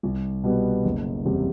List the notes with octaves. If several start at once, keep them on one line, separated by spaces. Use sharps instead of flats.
C2
B2 G3 B3
F#1
E2 C3 G3 C4